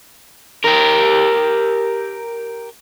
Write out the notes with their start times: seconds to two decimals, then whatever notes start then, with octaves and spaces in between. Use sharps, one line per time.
0.65 G4 A#4